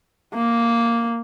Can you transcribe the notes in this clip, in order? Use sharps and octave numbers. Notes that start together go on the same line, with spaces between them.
A#3